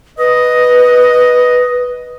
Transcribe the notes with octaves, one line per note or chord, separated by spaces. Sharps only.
B4 D#5